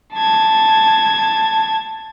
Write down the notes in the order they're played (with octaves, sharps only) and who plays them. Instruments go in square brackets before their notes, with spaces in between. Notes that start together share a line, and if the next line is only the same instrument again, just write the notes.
[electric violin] A5 G#6